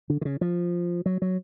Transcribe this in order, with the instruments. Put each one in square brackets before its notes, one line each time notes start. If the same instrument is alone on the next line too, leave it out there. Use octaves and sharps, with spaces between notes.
[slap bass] D3
D3
C#3
F3
F#3
F#3